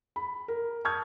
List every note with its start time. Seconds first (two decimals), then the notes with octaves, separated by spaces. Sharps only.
0.16 B5
0.48 A#4
0.85 A5 C#6 D#6 F6 G6 G#6